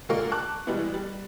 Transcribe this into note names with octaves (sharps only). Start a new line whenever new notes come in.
D3 G#3 A#3 F4 A#4 C#6
A5 C#6 D6 F#6
B2 E3 G3 G#3 B3 E4
G3